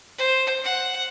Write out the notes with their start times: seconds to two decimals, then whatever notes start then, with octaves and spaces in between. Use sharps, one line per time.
0.18 C5
0.64 F#5